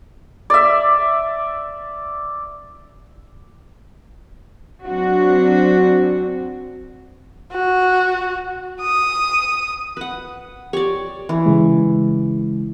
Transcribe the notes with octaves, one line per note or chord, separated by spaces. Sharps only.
D5 E5
F#3 C4 D4 F#4
F#4
D#6
B4 F#5
G4 C#5 D5
E3
C#3 G#3